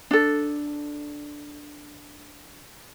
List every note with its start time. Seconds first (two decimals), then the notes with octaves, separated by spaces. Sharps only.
0.11 D4 A4